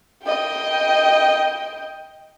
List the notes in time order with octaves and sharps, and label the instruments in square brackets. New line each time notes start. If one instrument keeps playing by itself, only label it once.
[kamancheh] D#5 G5